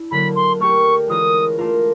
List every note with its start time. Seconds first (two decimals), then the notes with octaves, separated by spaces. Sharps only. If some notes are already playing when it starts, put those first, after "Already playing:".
Already playing: D4 E4
0.11 D3 F#3 A#3 B5
0.35 C6
0.60 A3 D4 G4 A#4 C#6
1.08 E3 G#3 C#4 F4 A#4 D#6
1.58 A3 D4 F4 A#4